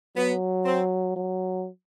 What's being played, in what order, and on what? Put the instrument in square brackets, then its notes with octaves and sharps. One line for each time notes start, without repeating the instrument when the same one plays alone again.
[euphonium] F#3 [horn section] B3
[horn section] C4
[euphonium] F#3